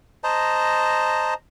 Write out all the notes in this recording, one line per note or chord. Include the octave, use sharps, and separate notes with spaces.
C5 D#5 A5 A#5